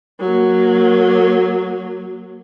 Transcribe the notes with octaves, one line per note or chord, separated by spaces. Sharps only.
F#3 A#3